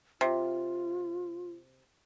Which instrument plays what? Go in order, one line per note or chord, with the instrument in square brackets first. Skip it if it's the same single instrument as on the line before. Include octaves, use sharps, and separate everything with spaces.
[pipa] C3 [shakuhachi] F4